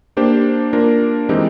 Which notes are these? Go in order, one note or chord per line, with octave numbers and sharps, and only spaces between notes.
A#3 D4 G4 C5
A#3 D4 F4 A#4
E3 G#3 C4 D#4 G4